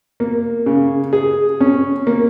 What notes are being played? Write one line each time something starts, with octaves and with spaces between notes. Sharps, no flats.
A#3
C#3
G#4
C#4
A#3